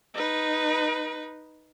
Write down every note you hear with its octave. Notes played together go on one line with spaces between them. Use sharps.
D#4 B4